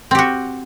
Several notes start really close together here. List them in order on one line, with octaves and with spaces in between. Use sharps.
C4 G4 F#4